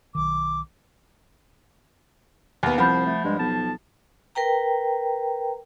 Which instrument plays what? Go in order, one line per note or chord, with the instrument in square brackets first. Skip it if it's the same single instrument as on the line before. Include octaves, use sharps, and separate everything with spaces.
[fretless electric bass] B1 D#3 [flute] D6
[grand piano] D#2 B3
[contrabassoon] C2 [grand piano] F3 [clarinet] C5 [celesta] F#5 B5 G6
[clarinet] A3
[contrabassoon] G2 [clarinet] G#3
[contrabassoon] B1 [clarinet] A5
[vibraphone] A#4 B4 G5 A#5